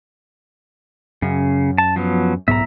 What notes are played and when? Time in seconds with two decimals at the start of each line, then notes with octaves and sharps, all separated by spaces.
1.22 F#2 C#3
1.78 A5
1.96 F3 F#3 B3
2.48 B1 G#2 B3 E5 A#5